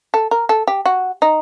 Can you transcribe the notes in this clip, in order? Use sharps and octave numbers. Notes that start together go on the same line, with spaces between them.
A4
A#4
A4
G4
F#4
D#4